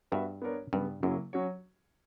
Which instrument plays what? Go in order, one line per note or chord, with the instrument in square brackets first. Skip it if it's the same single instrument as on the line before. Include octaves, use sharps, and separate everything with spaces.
[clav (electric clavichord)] G2 [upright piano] B3 F#4 B4 E5
[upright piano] B3 D4 A#4 C#5
[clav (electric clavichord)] G2 [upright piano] C#3 G3 B3
[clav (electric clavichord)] F#2 [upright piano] C#3 F#3 A#3 E4
[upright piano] F#3 C#4 F#4 C#5